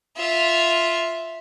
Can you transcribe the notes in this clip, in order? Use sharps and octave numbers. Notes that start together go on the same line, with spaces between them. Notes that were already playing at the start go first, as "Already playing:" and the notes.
F4 E5